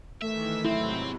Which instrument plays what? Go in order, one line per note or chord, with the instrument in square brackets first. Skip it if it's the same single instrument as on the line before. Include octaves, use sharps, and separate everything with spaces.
[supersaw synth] D#3 E3 [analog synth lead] A3 [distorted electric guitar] E5
[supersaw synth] G#2 C3 F#3 [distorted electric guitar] C4 [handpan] E4